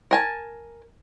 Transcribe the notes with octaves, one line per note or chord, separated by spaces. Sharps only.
A#4 G#5 A5